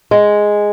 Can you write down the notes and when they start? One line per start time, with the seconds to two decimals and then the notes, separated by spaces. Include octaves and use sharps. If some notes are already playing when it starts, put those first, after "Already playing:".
0.11 G#3